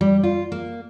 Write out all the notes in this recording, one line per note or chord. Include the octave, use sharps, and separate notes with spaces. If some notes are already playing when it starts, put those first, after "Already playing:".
G3
F4
A#3